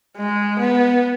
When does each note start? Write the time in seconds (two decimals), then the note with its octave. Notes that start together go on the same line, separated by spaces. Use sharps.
0.17 G#3
0.59 B3